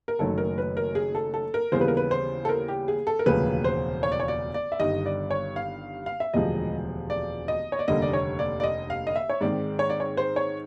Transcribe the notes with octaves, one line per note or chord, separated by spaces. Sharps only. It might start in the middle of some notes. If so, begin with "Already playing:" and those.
A#4
F#1 F#2 D#3 F#3 A3 A4
A#4
B4
A#4
G#4
A4
A4
A#4
D#2 C#3 E3 G3 B3 C5
B4
A#4
B4
C5
A4
A#4
G4
G#4
A4
A#4
E1 D2 C#3 F3 A#3 B4
C5
C#5
D5
C#5
D5
D5
E5
G1 G2 D#3 G3 D#5
D5
C#5
F5
F5
E5
E1 D2 C3 F3 G#3 D#5
D5
D#5
C#5
D5
F1 D#2 D3 G3 A#3 D#5
D5
C#5
D5
D5
D#5
F5
D#5
E5
C#5
G#2 D#3 G#3 C4 D5
C#5
D5
C#5
C5
C#5